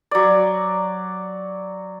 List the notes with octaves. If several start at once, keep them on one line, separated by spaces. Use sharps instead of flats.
F#3 D5